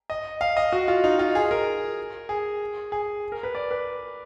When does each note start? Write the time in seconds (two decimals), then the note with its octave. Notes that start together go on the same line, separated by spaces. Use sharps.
0.10 D#5
0.41 F5
0.57 D#5
0.72 F#4
0.88 F4
1.04 D#4
1.19 F4
1.35 G#4
1.51 A#4
2.29 G#4
2.92 G#4
3.32 A#4
3.43 B4
3.55 D5
3.71 B4